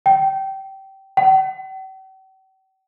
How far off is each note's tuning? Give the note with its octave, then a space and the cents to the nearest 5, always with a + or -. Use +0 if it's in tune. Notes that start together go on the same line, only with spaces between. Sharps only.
G5 -20
G5 -45